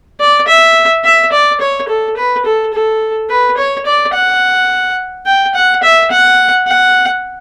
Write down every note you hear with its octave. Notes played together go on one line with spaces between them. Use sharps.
D5
E5
E5
D5
C#5
A4
B4
A4
A4
B4
C#5
D5
F#5
G5
F#5
E5
F#5
F#5